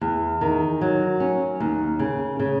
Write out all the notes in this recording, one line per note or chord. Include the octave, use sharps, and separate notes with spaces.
E2
D#3
F#3
C#4
D#2
C#3
C#3